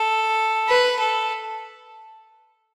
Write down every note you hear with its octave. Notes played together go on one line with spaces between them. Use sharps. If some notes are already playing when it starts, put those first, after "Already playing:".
Already playing: A4
B4
A4